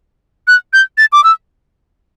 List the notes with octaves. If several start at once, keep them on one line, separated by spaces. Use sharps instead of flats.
F#6
G6
A6
D6
E6